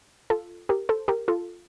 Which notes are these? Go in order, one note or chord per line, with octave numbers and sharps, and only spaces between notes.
F4 A4
G4 A#4
A4 C5
G4 A#4
F4 A4